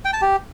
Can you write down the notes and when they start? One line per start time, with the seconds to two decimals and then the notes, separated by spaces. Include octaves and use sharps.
0.05 G5
0.13 A5
0.21 G4